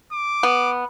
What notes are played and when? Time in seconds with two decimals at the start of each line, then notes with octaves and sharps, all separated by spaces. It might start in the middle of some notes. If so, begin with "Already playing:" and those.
0.13 D6
0.43 B3